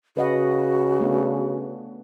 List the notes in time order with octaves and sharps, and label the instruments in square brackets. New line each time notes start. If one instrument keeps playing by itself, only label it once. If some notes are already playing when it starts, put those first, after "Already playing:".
[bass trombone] C#3 [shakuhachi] F#4 [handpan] B4 D#5 F#5
[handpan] A3 B3 D4